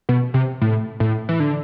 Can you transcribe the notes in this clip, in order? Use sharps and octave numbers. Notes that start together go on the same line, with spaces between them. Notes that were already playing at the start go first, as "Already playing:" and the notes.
B2
C3
A2
A2
E3
D3